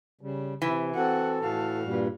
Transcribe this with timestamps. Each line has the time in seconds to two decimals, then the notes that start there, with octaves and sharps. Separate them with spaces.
0.21 C#3 G3
0.62 C3 E3
0.95 C4 F#4 A4 F#5
1.41 A2 F#4 F5
1.85 G2 A#2 G3